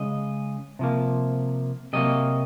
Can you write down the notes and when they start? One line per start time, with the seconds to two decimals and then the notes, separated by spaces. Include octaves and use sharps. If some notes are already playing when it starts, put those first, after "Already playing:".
Already playing: C#3 G#3 D#5
0.79 C3 F3 A#3
1.93 C3 F#3 A#3 D#5